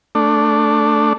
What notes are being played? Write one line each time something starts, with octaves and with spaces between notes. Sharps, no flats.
A3 D4